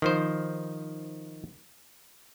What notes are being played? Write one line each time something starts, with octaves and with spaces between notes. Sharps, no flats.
D#3 F3 C5